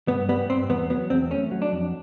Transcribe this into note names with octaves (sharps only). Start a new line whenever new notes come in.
G2 B3
G3 B3
G2 C4
E2 B3
F#3 B3
E2 C4
A3 C#4
F#3
D4
F2